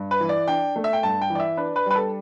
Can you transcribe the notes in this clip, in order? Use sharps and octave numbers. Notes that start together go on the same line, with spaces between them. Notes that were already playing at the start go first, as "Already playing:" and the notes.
Already playing: G2
B4
E3
D5
D4 G5
A3
E5
G5
G2 A5
G5
E3
D5
E5
D4 B4
B4
G3 B4
A4